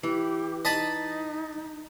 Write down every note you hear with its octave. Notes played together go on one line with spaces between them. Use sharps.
E3 G4
D#4 D#5 A5 B5